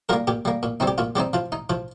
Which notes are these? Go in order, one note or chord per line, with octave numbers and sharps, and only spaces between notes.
G3 A#3 F4 A#4
A#2 G4
G3 A#3
A#2
G3 C4 D#4
G4
A#2 F4
G3 C4 D#4 G4
F3 F4
D#4
F3 F4